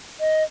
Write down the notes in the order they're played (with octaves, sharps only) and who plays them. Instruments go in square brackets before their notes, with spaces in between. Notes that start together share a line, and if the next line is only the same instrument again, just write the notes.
[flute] D#5